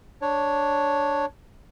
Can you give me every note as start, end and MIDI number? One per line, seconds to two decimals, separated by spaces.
0.22 1.26 62
0.22 1.26 73